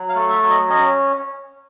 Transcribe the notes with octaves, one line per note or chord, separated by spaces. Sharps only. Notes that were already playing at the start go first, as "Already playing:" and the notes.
Already playing: F#3
F5
A3
E5
F#3
D#5
C#4 D#5